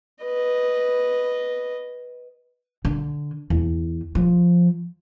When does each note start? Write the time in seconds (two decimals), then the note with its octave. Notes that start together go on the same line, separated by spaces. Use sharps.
0.24 B4 D#5
2.85 D3
3.50 E2
4.15 F3